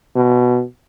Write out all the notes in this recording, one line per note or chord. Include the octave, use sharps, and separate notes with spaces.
B2